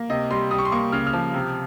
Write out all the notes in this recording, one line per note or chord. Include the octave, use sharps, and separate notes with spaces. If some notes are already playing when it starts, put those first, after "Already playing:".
Already playing: A#3
C3 D#5
G3 C6
G3 D#6
C#6
C6
A#3 C#6
C#3 F6
F6
F3
C3